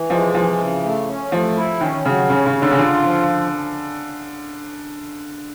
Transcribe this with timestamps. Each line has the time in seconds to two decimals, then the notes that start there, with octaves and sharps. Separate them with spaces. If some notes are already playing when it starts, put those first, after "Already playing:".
Already playing: E3
0.10 F3 G#3
0.34 E3 F3
0.59 C#3
0.83 A3
1.07 C#4
1.32 F3 A3
1.56 E4
1.80 D#3 C#4
2.05 C#3 F#3
2.30 C#3 C#4
2.46 C#3
2.55 C#4
2.62 D3
2.71 C#3
2.79 D3 F4
3.03 F3